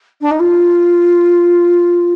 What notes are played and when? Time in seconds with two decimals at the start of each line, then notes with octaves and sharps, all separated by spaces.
0.21 D4
0.31 D#4
0.40 F4